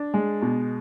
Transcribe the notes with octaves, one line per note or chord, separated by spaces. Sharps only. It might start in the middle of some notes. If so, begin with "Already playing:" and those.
Already playing: D4
G#3
B2